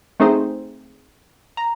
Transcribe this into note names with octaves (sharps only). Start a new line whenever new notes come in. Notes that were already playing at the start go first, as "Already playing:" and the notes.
A3 C4 D#4 G#4 C5
A#5